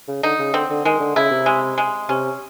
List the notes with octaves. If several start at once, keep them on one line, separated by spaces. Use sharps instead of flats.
C#3
D3 D#4
C#3
D3 C4
D3
D#3 G#3
D3
C#3 E4
C3
G#3
G#3
C3 C#4